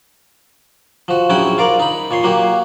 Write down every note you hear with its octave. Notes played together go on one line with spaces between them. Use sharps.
F3 F#4
A#1 F#3 C#4 E4 F#4 G5
F4 A#4 D5
D#4 B5
A#2 C#5 C6
F#3 A#3 G4